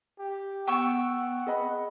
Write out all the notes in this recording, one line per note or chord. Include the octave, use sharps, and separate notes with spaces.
G4
B3 F#5 G5 C#6 E6
G#4 D#5 B5